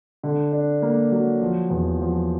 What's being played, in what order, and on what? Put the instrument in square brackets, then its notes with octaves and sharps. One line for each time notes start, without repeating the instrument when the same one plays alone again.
[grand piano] D3
D4
A#3
F#3
F3
E2
F3